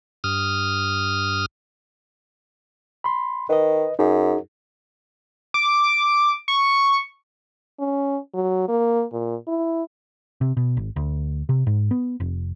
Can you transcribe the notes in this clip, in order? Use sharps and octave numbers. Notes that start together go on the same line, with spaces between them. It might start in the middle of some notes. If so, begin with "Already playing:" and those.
G2 D#6 F6
B5 C6
D#3 B4 D#5
F#2 D#4 G#4
D6
C#6
C#4
F#3
A#3
A#2
E4
C3
B2
G#1
D2
C3
G#2
B3
F1